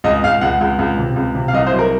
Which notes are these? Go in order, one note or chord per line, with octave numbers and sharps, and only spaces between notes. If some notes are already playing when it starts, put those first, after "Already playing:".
C#2 D#5
C#2 F5
C#2 F#5
C#2
C#2
C3
C#2
C3
F5
C2 D#5
C5
F#3
A#4